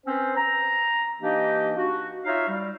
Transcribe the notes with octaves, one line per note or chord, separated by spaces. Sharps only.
C4 C#4 B4 C5
A#5
E3 A#3 D4 D#4 G4 D#5
F#4
D#4 F4 C#5 E5 F5
G3